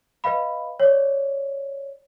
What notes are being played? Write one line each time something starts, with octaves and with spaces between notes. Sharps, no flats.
B4 D#5 F5 B5
C#5 D5